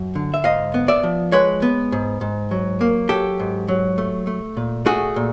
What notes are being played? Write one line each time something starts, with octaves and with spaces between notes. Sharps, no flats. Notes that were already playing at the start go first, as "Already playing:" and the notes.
Already playing: F#2
D3
E5
G#2 D#5 F5
B3
D5 E5
F3
G#3 B4 C#5
B3
G#2
G#2
F#3
A#3
F#3 G4 A4
G#2
F#3
A3
A3
A#2
A3 F#4 G#4
A#2